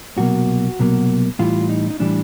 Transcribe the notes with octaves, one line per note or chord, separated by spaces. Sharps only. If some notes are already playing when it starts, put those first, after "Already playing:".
C2 B2 F#3 A#3 F#4
C2 B2 F#3 A#3
A2 E3 G3 F4
D#4
D#4
A2 E3 G3 D4